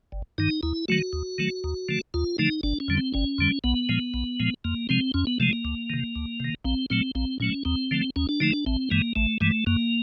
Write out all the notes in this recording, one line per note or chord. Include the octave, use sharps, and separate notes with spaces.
G1
G2 D#3 D#4
D#2 E4
D#3 F#3 A3 F#4
D#2
D#3 F#3 A3
D#2
D3 F3 A3
D#2 F4
D3 F3 A3 D#4
G1 D4
C#4
F2 D3 G3
C4
G1 C#4
F2 D3 G3
B1 B3
A#2 F3 G#3
B1
A#2 F3 G#3
F2 A#3
C3 F3 G#3 C4
F2 C#4
B3
C3 F3 G#3 A3
A#3
D2
C3 D#3
D2
C3 D#3
A#1 C4
A#2 F#3 A3 C4
A#1 C4
A#2 F#3 A3 C#4
D#2 C4
D3 F3 A3
D#2 C#4
D4
D3 F3 A3 D#4
D4
A1 C4
G2 E3 G#3 A#3
A1 A3
G2 E3 G#3 A3
F#2 A#3